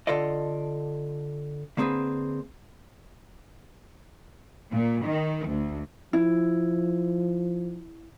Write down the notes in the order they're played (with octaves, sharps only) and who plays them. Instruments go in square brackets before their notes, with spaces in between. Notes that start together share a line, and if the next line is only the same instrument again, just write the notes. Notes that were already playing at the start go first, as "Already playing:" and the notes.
[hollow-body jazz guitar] D3 F4 A4 D5 D#5
D3 A#3 C4 G#4 B4
[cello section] A#2
D#3
D2
[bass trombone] F3 [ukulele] E4